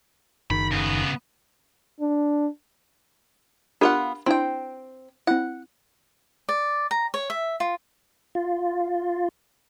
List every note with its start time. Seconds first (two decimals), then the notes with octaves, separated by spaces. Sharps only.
0.50 F#1 D#3 B5
0.71 C#3 B3
2.00 D4
3.81 B3 D4 F4 G4 A#4 F#5
4.26 C4 D4 E4 G5 C6
5.27 C4 E4 F#5
6.49 D5
6.91 A#5
7.14 C#5
7.30 E5
7.60 F4
8.35 F4